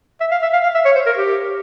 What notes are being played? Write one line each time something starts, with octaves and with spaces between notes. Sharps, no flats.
E5
F5
E5
F5
F5
E5
C#5
C5
A#4
G4